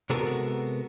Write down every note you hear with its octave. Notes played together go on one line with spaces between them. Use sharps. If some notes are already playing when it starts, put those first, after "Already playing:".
C3 G#3 B3 F#4 A4 A#4